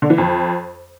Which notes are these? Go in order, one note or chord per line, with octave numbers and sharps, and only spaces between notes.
D3
E3
F2